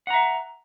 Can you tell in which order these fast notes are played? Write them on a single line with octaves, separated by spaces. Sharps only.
F#5 A#5 E5